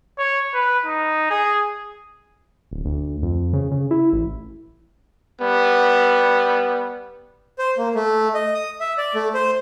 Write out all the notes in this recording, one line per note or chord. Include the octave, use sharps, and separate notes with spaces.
C#5
B4
D#4
G#4
D1
D2
F2
C#3
C#3
E4
A1
G3 B3
C5
A#3
A3
D#5
D#6
E5
D5
A3
C5